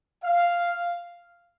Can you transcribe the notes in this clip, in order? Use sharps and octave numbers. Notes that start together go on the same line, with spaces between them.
F5